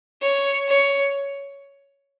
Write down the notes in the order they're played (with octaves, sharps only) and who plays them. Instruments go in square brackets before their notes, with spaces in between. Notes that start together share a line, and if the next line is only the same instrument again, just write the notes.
[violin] C#5
C#5